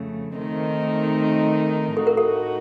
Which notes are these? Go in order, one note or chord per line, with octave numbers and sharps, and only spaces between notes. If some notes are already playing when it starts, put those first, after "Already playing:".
Already playing: F2 C#3 A3
D#3 A3 C4 D#4 A#4
A2 A3 D#4 F#4 A4
A#4
A4